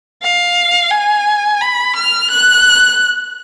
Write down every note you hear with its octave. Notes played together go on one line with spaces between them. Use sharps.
F5
G#5
B5
F6
F#6